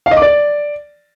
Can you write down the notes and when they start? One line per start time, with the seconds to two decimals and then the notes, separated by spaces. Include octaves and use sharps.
0.06 F5
0.11 D#5
0.17 D6
0.22 D5